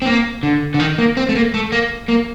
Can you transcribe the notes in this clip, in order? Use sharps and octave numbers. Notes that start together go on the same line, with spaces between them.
C4
A#3
D3
D3
D#3
A#3
C4
A3
A#3
A3
A#3
A#3